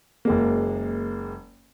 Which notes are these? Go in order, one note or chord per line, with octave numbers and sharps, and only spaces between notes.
F#1 G#3 A#3